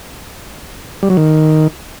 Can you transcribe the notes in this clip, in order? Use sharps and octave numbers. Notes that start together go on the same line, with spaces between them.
G3
F#3
D#3